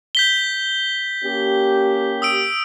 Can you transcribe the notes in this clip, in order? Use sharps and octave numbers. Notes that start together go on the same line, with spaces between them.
G6 B6 G7
A#3 C#4 G4
D#6 E6 D7